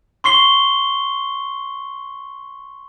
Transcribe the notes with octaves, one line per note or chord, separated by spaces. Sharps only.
C6 C#6 C7 G7